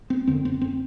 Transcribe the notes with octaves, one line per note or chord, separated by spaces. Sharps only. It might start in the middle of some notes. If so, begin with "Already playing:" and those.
C4
F#2 D3 C4
C4
C4